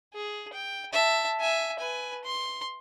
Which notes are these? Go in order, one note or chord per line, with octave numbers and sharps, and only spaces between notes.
G#4
G5
E5 A5
E5 G#5
B4 G#5
C6